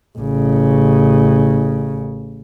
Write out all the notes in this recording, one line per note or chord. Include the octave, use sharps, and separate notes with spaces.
A1 C#3